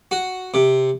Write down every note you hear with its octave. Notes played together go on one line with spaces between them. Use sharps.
F#4
C3